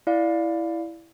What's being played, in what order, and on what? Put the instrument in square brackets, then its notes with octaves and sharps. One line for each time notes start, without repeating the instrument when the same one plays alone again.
[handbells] E4 D5 F5